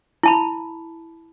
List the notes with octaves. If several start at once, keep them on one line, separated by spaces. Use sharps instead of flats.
E4 A5 B5